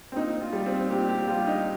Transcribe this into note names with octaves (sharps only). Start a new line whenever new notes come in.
C4
A#2 D#4
F4
G3
C4
A#2 G4
G4
G3 F4
D#4